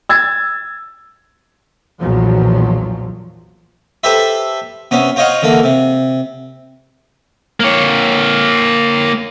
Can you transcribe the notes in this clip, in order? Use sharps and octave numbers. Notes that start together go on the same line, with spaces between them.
E6 G#6 A6
B1 E2 A#2 F3 F#3
G4 A4 B4 C5 E5
C3 B3 C#4
F4 C5 C#5 D#5 F5 F#5
D3 E3 A#3
C3
A#3 C#5